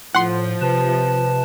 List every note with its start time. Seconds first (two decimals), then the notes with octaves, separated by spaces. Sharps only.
0.15 A2 F3 F#5 C6
0.61 C3 B4 A5